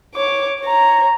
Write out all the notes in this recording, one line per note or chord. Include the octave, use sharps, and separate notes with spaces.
C#5 D6
C#5 A#5